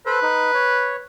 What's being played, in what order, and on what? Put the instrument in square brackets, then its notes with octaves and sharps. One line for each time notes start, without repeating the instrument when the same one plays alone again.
[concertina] A4 C5 [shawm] B4
[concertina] D#4
C#5